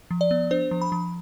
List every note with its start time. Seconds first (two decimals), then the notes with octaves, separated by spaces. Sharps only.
0.11 F3
0.21 D5
0.31 B3
0.51 D4 C5
0.71 F3
0.82 B5
0.92 F3